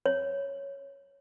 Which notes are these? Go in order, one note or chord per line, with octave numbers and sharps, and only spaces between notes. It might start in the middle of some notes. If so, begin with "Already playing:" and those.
C#5